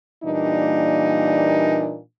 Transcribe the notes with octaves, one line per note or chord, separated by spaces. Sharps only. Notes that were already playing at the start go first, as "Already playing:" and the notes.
A#2 E3 G3 A#3 D4 D#4